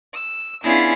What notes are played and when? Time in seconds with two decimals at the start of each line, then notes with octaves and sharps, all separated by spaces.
0.14 E6
0.64 B3 C#4 D4 E4 F4 G#4